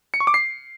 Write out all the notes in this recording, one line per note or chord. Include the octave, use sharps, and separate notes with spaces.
C#7
C#6
D6
C7